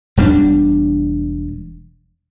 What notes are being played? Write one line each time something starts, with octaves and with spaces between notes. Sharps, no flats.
E1 G3 A#3 D4